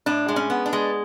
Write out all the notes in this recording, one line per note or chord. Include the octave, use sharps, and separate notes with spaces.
A2 D4
G#3
C#4
B3
D4
G#3